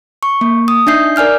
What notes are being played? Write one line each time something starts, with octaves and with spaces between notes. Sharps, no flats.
C#6
A#3
D#6
D4 D#4 E5 G6 C7
A#4 D5 G#5 F6 G6